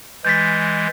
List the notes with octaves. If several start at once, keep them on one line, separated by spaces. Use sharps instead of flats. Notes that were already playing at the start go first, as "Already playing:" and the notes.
E3 G#3 G6 A6 B6